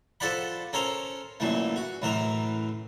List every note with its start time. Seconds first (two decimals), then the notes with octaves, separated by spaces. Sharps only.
0.20 F3 A4 C5 D5 F#5 B5
0.73 C#4 A4 A#4 C5
1.40 F#2 A#2 E3 A3
1.76 F#4
2.02 F#2 A2 E3 A#4